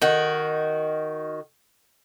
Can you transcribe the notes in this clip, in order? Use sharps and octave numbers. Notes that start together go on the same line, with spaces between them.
D#3 F#4